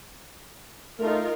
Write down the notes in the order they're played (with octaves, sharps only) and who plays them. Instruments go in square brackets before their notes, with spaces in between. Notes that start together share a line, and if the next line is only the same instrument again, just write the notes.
[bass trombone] A3 [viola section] D#4 F4 A#4